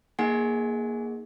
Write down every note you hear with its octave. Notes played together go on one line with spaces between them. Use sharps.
A#3 D#4 G#4 F#5 G#5